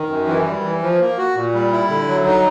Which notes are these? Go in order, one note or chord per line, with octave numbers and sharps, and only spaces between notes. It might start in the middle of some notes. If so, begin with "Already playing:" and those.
Already playing: D#3
F#2
E3
G3
E3
F3
A#3
F#4
A#2
G3
E4
D3
F#3
D#4